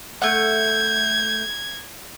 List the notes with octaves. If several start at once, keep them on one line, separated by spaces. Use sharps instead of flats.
A3 F#5 G6 G#6